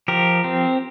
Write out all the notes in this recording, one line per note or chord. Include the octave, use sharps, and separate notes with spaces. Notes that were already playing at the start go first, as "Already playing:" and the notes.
F3 G4 A#4
C4